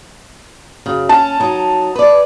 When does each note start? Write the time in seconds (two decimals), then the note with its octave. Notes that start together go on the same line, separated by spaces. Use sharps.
0.86 F#2 C#3
1.09 C#4 A5
1.40 F#3 D#4
1.95 B4 D5